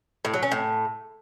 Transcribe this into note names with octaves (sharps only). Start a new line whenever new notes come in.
A2
F#3
C#4
A2